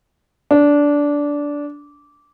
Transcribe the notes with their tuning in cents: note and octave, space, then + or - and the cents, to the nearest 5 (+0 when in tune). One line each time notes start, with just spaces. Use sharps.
D4 -15